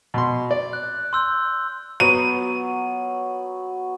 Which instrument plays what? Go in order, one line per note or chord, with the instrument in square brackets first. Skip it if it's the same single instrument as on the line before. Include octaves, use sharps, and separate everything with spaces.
[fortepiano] B2 C6
D5
[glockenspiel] F#6
C6 E6 G6
[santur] F#3 B3 [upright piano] D#7